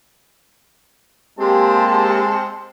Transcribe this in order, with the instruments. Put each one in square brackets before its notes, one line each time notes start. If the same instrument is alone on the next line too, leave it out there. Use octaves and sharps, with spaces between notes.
[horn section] G#3 C4 A5 [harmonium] A#3 G4